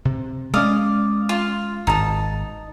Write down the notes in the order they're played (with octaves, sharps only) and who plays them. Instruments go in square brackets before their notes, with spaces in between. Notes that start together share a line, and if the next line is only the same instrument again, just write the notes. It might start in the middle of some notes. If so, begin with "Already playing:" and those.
[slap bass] C3
[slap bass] G#3 C#4 [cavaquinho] D5 F5 D#6
[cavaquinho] F4
[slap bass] G#1 [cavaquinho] D#4 A5